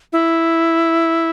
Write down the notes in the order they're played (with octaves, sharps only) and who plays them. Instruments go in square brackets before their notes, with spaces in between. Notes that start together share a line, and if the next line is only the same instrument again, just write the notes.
[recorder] E4